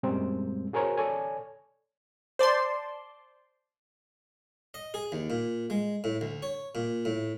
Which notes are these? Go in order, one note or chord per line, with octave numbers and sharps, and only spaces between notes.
F#2 A#2 G3 G#3 C4
F#4 G#4 A#4 C5 C#5 G#5
A4 C#5 D5 G#5
C5 D5 A5 C6
D#5
G#4
D#2
A#2
G#3
A2
D2
C#5
A#2
A2